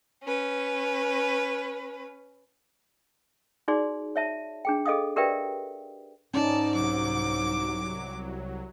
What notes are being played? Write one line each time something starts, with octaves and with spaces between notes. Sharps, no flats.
C#4 B4
D#4 F#4 G#4 D5 C6
C#5 E5 A5
D4 G#4 G5
G#4 A4 D#5 F5 D#6
G4 A#4 B4 D5 E5 G5
G#2 C#4 D#4 D5 A5
C2 F#3 D6